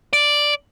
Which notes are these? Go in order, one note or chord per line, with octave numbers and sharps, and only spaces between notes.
D5